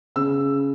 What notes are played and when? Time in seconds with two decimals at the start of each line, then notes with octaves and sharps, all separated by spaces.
0.16 C#3 E6